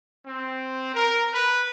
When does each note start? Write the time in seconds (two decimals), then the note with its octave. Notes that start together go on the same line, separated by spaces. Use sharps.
0.24 C4
0.94 A#4
1.34 B4